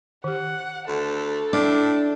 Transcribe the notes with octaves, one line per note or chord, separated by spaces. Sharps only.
D#3 G4 F#5
D2 A4
A2 D4 D6